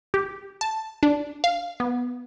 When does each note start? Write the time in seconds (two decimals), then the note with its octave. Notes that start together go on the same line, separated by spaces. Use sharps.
0.14 G4
0.61 A5
1.03 D4
1.44 F5
1.80 B3